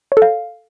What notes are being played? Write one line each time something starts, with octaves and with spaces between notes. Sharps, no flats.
C#5
A4
F5